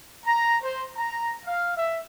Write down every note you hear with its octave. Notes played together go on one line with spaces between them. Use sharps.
A#5
C5
A#5
F5
E5